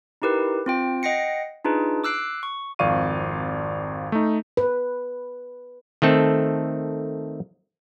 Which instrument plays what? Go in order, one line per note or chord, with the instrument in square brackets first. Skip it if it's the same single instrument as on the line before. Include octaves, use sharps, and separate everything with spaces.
[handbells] D#4 E4 G4 A#4 B4
C4 F4 G5
D#5 F#5 G5 A#6 C7 C#7
D4 D#4 F4 G#4 B4
D6 E6 F#6 C7 D7
C#6
[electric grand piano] G#1 F2 D5 F5 C#6 D#7
A3 D#4
[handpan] B4
[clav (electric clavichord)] D#3 A3 C4 A4